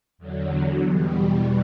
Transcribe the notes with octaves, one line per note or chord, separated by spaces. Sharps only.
E2 D3 F#3
E2 B2 G3